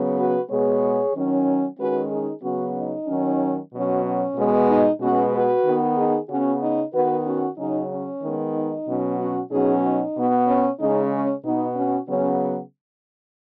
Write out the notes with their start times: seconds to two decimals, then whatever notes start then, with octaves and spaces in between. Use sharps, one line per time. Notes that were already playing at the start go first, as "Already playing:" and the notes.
Already playing: C#3 F#3 B3
0.17 F#4 B4
0.50 B2 G#3 B3 G#4 C#5
1.14 D#3 F#3 C#4
1.78 D#3 G#3 C#4 F#4 B4
2.11 D#4 G#4
2.43 C#3 F#3 B3 C#4 F#4
2.76 D#4
3.08 D#3 F#3 C#4
3.72 B2 F#3 C#4
4.04 C#4
4.36 B2 G#3 B3
4.69 D#4
5.00 B2 G#3 B3 C#4 F#4
5.33 F#4 B4
5.65 D#3 B3
5.97 D#4 G#4
6.29 C#3 B3 C#4 F#4
6.61 D#4
6.93 D#3 B3 F#4 B4
7.26 C#4 F#4
7.58 C#3 F#3 C#4 D#4
7.90 C#4
8.23 D#3 G#3 B3
8.55 D#4
8.87 B2 F#3 C#4
9.19 C#4 F#4
9.51 B2 F#3 C#4 D#4 G#4
9.83 D#4
10.16 B2 B3
10.47 C#4
10.80 C#3 G#3 C#4 D#4
11.12 C#4
11.44 B2 B3 D#4
11.76 C#4 F#4
12.09 C#3 F#3 B3 C#4